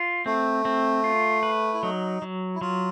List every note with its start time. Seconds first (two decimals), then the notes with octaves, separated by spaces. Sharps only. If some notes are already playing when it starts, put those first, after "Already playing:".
Already playing: F4
0.26 A3 C4
0.65 C4
1.04 F4
1.43 B4
1.74 E4
1.83 F#3 D#4
2.22 F#3
2.55 E4
2.61 F#3 F4